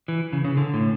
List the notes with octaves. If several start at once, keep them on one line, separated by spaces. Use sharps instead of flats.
E3
C#3
C#3
D3
A2